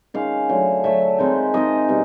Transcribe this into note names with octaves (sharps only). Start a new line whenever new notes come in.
D#3 G#3 C#4 F5
D3 F#3 A3
D3 F#3 A3 E5
D#3 G#3 C4 D#4
D#3 G#3 C4 D#4 D#5
B2 G3